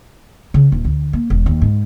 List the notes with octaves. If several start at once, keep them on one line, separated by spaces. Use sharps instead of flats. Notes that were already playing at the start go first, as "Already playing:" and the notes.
C#3
D#1
D2
A#3
E1
D#2
G#2